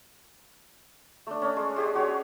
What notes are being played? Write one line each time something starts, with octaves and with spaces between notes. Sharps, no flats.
A3 D4
C#4 D4
G#3
G#3 G4 G#4
F#4 C#5